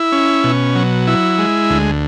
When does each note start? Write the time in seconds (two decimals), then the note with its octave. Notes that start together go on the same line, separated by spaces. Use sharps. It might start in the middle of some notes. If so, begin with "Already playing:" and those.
Already playing: E4
0.12 C#4
0.44 B2
0.75 F#3
1.07 E4
1.39 G#3
1.70 D2